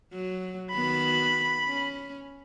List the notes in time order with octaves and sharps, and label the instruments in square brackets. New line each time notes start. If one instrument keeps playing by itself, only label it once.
[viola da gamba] F#3
[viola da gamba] D#3 B3 F#4 [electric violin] B5
[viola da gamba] C#4